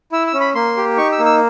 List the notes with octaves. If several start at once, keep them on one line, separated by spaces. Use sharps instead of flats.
E4 E6
E6
C#4
B5
A#3 C6
G4
D#4 C#6
E6
A#3
E6